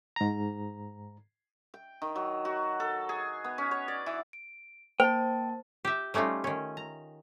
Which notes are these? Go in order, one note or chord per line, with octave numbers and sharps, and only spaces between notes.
G#2 A#5
G5
D#3
F#3
F#4
A4
G#4
B3
C#4
C#5
D5
E3
D7
A#3 C5 G5 A5
G4 E5
G3 A3 C#4 D#4 F4
D#3 C#4
A#5